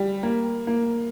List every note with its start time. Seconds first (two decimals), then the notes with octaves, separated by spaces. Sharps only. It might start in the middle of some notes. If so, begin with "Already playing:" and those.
Already playing: G3
0.23 A#3
0.67 A#3